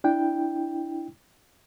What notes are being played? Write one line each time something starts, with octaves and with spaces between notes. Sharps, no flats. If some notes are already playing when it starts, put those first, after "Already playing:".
D4 E4 G5